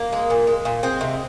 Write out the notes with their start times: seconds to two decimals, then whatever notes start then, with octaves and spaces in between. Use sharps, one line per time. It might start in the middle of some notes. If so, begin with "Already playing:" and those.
Already playing: A#3
0.12 G#3
0.30 A#2
0.47 G#3
0.65 A#2
0.83 G#3 C4
1.01 C3